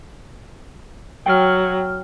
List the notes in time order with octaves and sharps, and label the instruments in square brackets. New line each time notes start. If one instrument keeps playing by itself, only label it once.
[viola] F#3 [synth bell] G5 F6